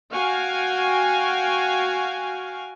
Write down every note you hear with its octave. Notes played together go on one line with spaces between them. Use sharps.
F#4 F5 G5 G#5